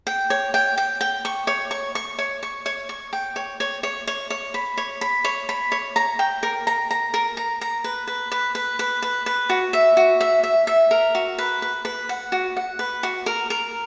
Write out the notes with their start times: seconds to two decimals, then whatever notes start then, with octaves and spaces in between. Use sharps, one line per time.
0.07 G5
0.30 C#5
0.54 G5
0.78 G5
1.01 G5
1.25 C#6
1.47 C#5
1.71 C#6
1.95 C#6
2.19 C#5
2.43 C#6
2.66 C#5
2.89 C#6
3.13 G5
3.36 C#5
3.60 C#5
3.83 C#5
4.07 C#5
4.30 C#5
4.54 B5
4.77 C#5
5.01 B5
5.24 C#5
5.49 B5
5.72 C#5
5.96 A#5
6.19 G5
6.43 A#4
6.67 A#5
6.91 A#5
7.14 A#4
7.37 A#5
7.61 A#5
7.84 B4
8.07 B4
8.32 B4
8.55 B4
8.79 B4
9.02 B4
9.26 B4
9.50 F#4
9.73 E5
9.97 F#4
10.20 E5
10.43 E5
10.67 E5
10.91 A#4
11.15 F#4
11.38 B4
11.62 B4
11.85 B4
12.09 F#5
12.32 F#4
12.57 F#5
12.79 B4
13.03 F#4
13.26 A#4
13.50 A#4